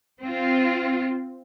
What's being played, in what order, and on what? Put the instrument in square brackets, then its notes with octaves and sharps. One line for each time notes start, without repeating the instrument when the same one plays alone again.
[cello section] C4 F4